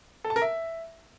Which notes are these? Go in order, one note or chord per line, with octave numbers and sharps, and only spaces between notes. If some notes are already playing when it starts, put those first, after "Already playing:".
A4
A5
A#4
E5